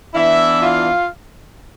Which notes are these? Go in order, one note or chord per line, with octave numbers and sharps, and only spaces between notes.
E3 B3 D4 E4 E5
F4 F5